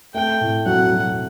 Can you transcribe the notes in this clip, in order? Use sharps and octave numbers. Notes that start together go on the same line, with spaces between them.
A3 G5
A2
F#3 F#5
F#3